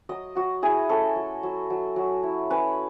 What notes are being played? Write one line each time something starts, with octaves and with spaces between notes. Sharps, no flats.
F#3 D#5
F#3 F#4
E4 G#4
C#4 A4
F#3
F#3
F#3
F#3
E4
C#4 B4